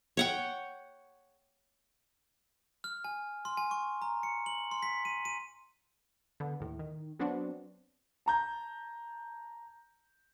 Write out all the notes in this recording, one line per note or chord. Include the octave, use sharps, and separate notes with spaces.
C#5 F#5 G5
F6
G#5
C6
G#5
C#6
A#5
C#7
F#7
C6
B6
D#7
D#7
D3 B3
D#2 A2
D#3
F#3 B3 C4 D4 F#4
A5 A#5 G6